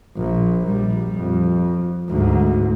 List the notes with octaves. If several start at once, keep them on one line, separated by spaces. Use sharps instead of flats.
A#1
A#1 G3
F2
D2 G#2